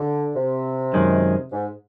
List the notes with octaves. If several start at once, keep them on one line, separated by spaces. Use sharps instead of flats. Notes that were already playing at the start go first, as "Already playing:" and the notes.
Already playing: D3
C3
F#2 D#3 G#3
G#2